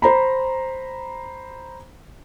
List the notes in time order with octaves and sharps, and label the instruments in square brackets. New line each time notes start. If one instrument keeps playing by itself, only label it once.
[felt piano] C5 A#5 B5